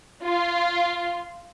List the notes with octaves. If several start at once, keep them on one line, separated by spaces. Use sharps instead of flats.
F4